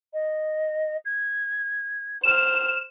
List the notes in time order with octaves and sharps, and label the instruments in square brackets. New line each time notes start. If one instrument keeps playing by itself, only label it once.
[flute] D#5
G#6
[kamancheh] C5 F6 [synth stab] E7